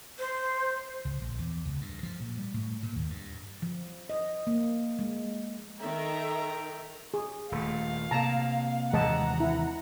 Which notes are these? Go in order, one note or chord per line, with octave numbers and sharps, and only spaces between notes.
C5
C#2
A#1
E2
C#2
G2
F3
A#2
G3
A2
A#2
D#2
G2
F3
D#5
A#3
G#3
D#3 A4 E5 G5 A#5
G#4
D#1 A3 F5
C3 A#3 A5 A#5
D#2 C3 E3 G#3 D#5 F#5 A5 A#5
E4